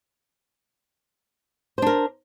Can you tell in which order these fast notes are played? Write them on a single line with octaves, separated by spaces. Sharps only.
C5 D4 A#4